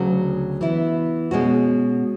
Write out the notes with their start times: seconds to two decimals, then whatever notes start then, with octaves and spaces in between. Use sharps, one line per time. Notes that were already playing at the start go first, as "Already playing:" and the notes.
Already playing: D2 C#3 F#3 C#4 F#4
0.61 E3 B3 E4
1.31 B2 G#3 C#4 F#4